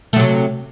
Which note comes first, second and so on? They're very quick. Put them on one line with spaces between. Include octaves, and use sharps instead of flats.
A3 F#3 C3